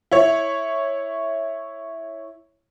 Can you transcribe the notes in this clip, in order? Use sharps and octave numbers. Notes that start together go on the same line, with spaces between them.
E4 C#5